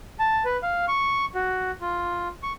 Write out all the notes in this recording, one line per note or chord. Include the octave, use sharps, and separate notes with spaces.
A5
B4
F5
C#6
F#4
F4
C#6